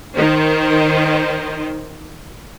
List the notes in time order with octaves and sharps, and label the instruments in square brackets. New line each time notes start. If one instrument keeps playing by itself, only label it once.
[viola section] D#3 C5